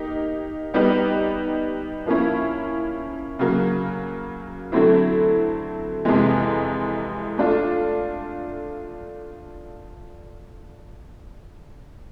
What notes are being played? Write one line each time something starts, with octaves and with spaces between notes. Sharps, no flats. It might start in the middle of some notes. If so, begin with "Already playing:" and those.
Already playing: A#3 D#4 G4
G3 B3 D#4 G4 B4
F3 A#3 C#4 E4
C#3 F#3 A#3
D3 F#3 A3 C4 E4
F2 C3 E3 G#3
A3 D4 F4